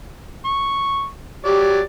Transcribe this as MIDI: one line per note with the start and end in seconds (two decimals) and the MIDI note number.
0.45 1.06 85
1.45 1.79 54
1.45 1.81 67
1.45 1.79 74